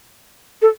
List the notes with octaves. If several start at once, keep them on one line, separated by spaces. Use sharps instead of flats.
A4